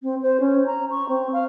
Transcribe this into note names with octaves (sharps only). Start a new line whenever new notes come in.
C4
C5
C#4
A#5
C#6
C4
F5